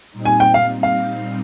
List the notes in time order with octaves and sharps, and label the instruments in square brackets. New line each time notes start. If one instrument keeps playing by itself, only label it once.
[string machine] A#2 G3 C4 D#4
[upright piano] G#5
G5
F5
F5